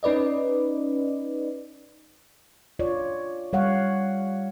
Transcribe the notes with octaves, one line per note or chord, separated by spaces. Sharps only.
C#4 D#4 B4 D5 D#5
F4 C#5 D5
G3 C#5 F5 F#5